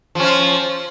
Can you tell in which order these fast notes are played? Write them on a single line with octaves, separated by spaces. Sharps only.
F3 C#4 F4